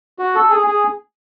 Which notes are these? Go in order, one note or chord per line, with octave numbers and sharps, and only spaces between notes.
F#4
A4
G#4
G#4